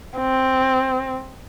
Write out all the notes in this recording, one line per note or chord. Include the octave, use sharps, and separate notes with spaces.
C4